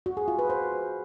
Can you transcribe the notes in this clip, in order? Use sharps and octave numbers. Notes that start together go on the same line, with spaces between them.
F#4
G#4
F4
B4
C5